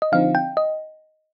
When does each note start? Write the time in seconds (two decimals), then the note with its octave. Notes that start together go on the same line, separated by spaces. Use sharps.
0.02 D#5
0.12 D3 F3 C4 D#4 F5
0.35 G5
0.57 D#5